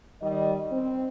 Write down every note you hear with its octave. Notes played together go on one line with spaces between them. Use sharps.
D#3 G3 D#5
C4